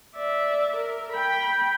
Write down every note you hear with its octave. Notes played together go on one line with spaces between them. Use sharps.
D5 E5
A#4
G5 B5